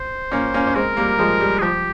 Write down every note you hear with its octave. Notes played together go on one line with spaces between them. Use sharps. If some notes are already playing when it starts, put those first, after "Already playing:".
Already playing: C5
A#3 C#4
A#3 C#4
C#4
G#3 C4 A#4
G3 A#3
F3 G#3
G3
G#4
F3 G4